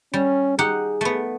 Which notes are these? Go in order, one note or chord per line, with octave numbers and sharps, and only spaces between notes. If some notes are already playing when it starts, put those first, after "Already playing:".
G3 C#4
D#4 G4 G#4 F#5
A3 B3